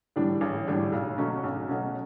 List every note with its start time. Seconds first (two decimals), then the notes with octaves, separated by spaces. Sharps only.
0.16 A2 E3 G3 D4
0.41 A1
0.67 A2 E3 G3 D4
0.92 B1
1.18 B2 F#3 A3 C#4
1.44 B1
1.69 B2 F#3 A3 C#4